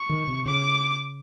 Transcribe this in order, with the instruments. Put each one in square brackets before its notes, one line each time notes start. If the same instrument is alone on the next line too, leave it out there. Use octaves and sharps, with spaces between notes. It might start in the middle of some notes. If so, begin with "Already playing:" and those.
Already playing: [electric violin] C#6
[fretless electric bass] D#3
C3
[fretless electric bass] C#3 [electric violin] D6